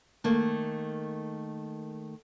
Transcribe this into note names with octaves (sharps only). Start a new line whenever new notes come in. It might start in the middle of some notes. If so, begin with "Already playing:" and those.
D#3 A3 A#3